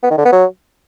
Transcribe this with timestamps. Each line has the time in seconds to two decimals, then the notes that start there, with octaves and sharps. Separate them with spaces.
0.03 B3
0.10 D#3
0.18 D3
0.25 B3
0.33 F#3